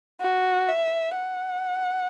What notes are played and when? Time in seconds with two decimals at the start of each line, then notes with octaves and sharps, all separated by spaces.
0.20 F#4
0.68 E5
1.16 F#5